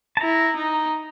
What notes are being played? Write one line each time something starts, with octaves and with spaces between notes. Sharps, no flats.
A5
E4 A#5
D#4